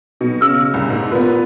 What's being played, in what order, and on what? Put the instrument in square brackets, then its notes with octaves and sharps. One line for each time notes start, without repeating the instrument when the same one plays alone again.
[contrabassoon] B1 [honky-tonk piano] B2
[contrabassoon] C#3 [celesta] E6 F6
[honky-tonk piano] C2
[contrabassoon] D#2 [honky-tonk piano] G#2
[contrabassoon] A#2 [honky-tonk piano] B3 B4